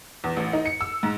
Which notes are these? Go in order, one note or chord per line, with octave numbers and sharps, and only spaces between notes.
E2
A1
D#4
C#7
E6
G#2